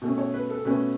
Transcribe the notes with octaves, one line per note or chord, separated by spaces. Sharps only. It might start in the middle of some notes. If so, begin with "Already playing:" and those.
B2 A3 C#4
C#5
B4
A4
B2 A3 C#4 B4